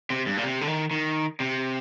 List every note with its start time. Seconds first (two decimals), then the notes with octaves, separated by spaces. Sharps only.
0.10 C3
0.26 G2
0.37 A#2
0.43 C3
0.61 D3
0.67 D#3
0.91 D#3
1.40 C3